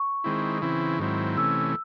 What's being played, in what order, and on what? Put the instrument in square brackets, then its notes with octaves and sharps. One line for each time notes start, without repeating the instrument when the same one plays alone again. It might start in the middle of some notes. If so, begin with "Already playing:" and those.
Already playing: [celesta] C#6
[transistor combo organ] D#3 G#3 C4 E4
C#3 E3 C4 E4
G#2 D#3 F#3 C4 E4
[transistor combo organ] C3 E3 A3 C#4 [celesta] E6